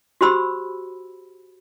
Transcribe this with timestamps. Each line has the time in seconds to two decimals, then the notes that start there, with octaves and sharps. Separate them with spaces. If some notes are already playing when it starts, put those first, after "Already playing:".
0.21 F#4 G4 C5 B5 E6